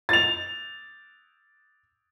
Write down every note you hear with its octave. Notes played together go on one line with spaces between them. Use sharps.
A6 F7